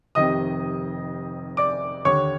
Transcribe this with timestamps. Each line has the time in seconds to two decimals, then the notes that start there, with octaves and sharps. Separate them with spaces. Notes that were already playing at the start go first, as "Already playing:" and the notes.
0.15 F1 F2 C3 D#3 D#5 D#6
1.57 D5 D6
2.05 D#2 D3 C#5 C#6